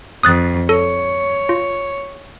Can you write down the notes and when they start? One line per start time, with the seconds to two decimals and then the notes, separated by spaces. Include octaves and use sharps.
0.23 F2 D#6 F#6 A6
0.69 A4 C#5
1.49 F4